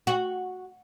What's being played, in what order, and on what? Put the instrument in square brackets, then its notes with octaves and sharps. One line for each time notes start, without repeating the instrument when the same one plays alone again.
[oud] F#4